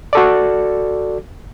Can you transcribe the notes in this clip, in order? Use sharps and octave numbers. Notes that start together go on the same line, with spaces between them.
F#4 A4 D5